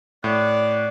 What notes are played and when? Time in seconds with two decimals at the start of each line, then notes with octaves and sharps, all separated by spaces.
0.24 A2 D5 F#5